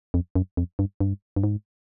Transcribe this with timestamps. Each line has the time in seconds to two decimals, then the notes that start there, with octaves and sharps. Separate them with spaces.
0.14 F2
0.35 F#2
0.57 F2
0.79 G2
1.00 G2
1.36 G2
1.44 G#2